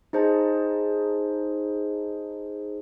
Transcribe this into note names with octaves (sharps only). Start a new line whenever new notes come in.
D#4 G#4 C5 D#5 A5